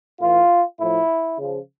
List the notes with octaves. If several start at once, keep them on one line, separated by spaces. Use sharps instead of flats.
A2 E3 F4
A2 F3 E4
C#3 F3